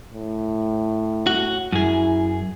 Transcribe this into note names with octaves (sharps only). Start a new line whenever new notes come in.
A2
F#4
F#2 E4 G#4